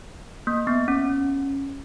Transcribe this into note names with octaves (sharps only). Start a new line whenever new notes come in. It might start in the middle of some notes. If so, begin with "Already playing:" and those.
A#3
B3
C#4